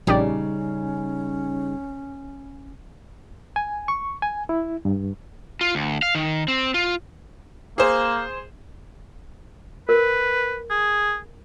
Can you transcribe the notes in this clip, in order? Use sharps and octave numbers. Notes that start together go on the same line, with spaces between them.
A#1 C#3 G3 C#4 D#4 G4 D5
G#5
C#6
G#5
E4
G2
F4
D2
F5
D#3
C4
F4
A#3 G#4 C5
A#4 B4
G#4